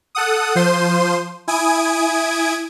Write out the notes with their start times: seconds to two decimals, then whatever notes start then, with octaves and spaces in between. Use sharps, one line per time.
0.15 A4 F#5 D#6
0.55 F3 C5 C6 D#7
1.48 E4 G#5 D#6 G#6 D7